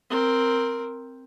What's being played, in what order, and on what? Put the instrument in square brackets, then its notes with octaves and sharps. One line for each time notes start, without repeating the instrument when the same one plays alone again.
[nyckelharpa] C4 A#4